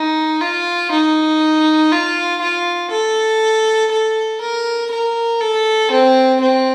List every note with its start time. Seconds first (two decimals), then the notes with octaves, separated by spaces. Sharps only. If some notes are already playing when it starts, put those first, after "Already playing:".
Already playing: D#4
0.41 F4
0.91 D#4
1.92 F4
2.41 F4
2.91 A4
3.91 A4
4.41 A#4
4.91 A#4
5.40 A4
5.91 C4
6.40 C4